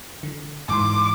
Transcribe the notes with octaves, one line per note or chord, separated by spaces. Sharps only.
D3
G#2 E3 C6 D6